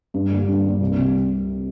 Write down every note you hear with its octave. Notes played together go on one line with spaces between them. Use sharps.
G2
D3 G3 A#3
G2
D3 G3 A#3
C2
C3 G3 C4 G4